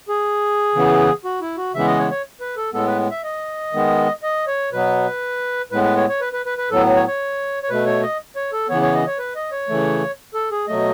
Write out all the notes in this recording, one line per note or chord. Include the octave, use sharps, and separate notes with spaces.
G#4
C#3 E3 B3
F#4
E4
F#4
C#3 E3 G#3 B3 E5
D#5
C#5
C#5
B4
A4
A2 G#3 B3 A4
B4
E5
D#5
D#3 G#3 B3
D#5
C#5
B2 F#3 B3 B4
A2 G#3 B3 B4
B4
C#5
C#5
B4
B4
B4
B4
A2 F#3 B3 A4
C#5
C#5
C#5
B2 A3 B4
C#5
D#5
C#5
A4
C#3 E3 B3 C#5
C#5
D#5
C#5
B4
D#5
C#5
C#3 E3 A3
A4
G#4
B2 F#3 A3 D#5